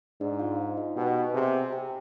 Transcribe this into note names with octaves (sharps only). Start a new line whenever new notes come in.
G#2 D4 D5
F4 F5
D#4 D#5
B2 G4 G5
C3 G#4 G#5
G4 G5